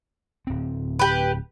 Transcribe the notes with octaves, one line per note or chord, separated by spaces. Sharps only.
D1 C4
G4 B4